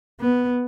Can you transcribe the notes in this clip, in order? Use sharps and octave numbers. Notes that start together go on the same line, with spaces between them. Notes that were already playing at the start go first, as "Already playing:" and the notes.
B3